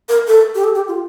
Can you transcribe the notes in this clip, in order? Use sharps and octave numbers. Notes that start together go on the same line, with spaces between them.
A#4
A4
G4
A4
G4
F4